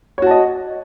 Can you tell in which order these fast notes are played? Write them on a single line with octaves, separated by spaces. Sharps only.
C#5 F#4 A5 D#5